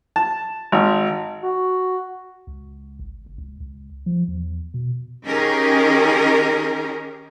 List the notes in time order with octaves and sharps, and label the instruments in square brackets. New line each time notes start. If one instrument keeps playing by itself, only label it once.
[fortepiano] A5
G#1
[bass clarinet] F#4
[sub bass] C#2
G#1
F#1
C#2
C#2
F3
E2
B2
[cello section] D#3 C#4 D#4 G4 G#4 A#4